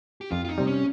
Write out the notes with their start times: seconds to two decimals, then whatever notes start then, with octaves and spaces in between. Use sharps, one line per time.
0.21 G4
0.31 F2 F4
0.45 F4
0.49 D#4
0.58 C3 G3
0.67 C#4